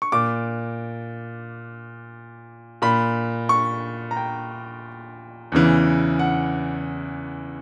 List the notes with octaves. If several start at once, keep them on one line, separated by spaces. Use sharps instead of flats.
C#6
A#2 D6
A#2 B5
C#6
A#5
G5
E2 C#3 E3
F#5